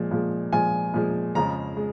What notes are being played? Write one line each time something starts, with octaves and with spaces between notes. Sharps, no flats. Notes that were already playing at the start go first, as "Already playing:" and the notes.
Already playing: A#2 F3 G#3
A#2 F3 G#3
A#2 F3 G#3 G#5
A#2 F3 G#3
F2 C#3 F3 G#3 A#5
G#3